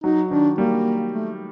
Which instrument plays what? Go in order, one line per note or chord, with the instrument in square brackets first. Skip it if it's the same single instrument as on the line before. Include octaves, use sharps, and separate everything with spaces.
[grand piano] F#3 [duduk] D#4
[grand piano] D#3 [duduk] D4
[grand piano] G3 [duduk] A#3
[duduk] A3